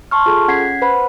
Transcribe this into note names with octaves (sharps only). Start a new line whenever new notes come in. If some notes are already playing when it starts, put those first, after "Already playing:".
A5 C6 C#6 F6
F4 G#4 A4
C#4 F#5 G#6 B6 C7
B4 C5 F#5 B5